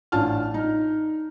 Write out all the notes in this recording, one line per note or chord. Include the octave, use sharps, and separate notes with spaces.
A1 D4 F4 A5 F6
D#4